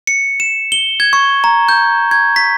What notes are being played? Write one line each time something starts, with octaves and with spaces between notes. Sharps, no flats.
C#7
E7
G7
G#6
C#6
A#5
G6
G#6
B6